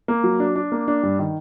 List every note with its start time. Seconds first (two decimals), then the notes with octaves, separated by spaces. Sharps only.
0.08 A#3
0.24 F#3
0.40 D4
0.56 D4
0.72 A#3
0.88 D4
1.03 G2
1.19 D#3